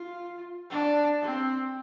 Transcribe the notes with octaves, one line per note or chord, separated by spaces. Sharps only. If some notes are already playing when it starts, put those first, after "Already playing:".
Already playing: F4
D4
C4